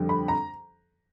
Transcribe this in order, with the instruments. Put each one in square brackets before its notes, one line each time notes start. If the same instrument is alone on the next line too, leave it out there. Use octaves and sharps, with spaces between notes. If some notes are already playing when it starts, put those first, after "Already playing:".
Already playing: [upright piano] F2 D3 G3
B5
A#5